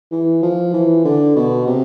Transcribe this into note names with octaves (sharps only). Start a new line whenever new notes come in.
E3
F3
E3
D3
B2
C3